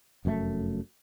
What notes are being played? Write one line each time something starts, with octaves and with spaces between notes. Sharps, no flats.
F1 F#2 A2 A3